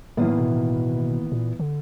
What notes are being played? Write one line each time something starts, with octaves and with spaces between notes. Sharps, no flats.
A2 D#3 E3 F#3 A#3 B3
B2
A#2
D3